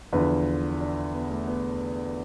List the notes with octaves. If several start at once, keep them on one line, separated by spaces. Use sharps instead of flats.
E2 D3 F3 B4
D4
B3
A3
B3